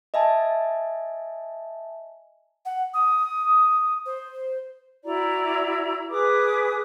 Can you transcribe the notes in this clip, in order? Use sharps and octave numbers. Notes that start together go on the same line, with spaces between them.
D#5 E5 G#5 A5
F#5
D#6
C5
E4 F#4 D5 A#5
G#4 B4 D6 D#6